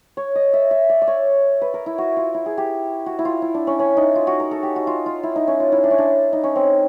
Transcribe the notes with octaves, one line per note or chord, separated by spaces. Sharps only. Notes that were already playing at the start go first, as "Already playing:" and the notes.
C#5
D#5
E5
E5
D5
D5
C#5
B4
A#4
E4
F#4
F4
E4
G#4
G4
F#4
E4
F4
E4
D4
C#4
C#4
D#4
F4
F#4
A#4
A4
G4
F#4
F4
F4
E4
D#4
C#4
F4
E4
D4
C#4
D4
D#4
C#4
C4